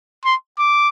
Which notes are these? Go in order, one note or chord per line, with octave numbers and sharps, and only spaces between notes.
C6
D6